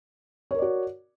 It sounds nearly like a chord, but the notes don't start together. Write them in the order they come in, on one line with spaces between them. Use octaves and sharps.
C#5 A#4 D5 F#4